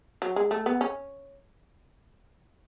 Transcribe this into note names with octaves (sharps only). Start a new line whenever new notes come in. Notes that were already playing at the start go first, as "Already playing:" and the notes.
F#3
G#3
A3
B3
C#4